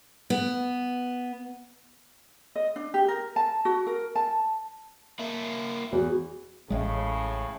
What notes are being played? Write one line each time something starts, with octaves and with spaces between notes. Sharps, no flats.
B3
D#5
D4
G4
A#4
A5
F#4
A#4
A5
A#3 E4
E2 F#4
A1 A2 C#3 G#3